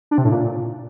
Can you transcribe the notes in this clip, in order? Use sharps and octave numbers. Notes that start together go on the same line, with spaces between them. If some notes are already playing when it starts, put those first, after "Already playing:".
D4
C3
A2
A#2